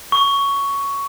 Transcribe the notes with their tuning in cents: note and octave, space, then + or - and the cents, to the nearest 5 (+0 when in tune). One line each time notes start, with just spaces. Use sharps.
C#6 +10